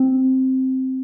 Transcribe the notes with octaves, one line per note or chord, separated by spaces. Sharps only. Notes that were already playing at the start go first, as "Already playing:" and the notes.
Already playing: C4